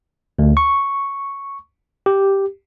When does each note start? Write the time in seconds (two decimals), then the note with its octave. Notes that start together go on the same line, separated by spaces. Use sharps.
0.39 D2
0.57 C#6
2.06 G4